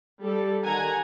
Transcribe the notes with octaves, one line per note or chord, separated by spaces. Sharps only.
G3 A4
D#3 F#5 G#5 A#5